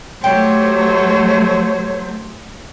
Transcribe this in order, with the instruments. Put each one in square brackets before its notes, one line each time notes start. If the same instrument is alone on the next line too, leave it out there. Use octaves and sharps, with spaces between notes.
[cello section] F#3 A3 C5 [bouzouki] G4 [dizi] C#5